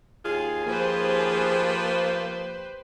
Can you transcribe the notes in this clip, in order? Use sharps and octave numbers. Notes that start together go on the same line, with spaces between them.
D#2 F4 G#4
F3 A#3 G4 B4 C5